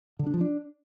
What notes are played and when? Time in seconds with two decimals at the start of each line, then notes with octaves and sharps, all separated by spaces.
0.19 D3
0.26 D4
0.34 F3
0.41 D4